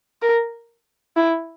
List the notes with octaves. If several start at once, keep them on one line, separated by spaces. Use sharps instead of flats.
A#4
E4